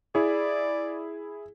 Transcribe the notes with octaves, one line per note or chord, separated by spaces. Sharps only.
E4 G#4 D5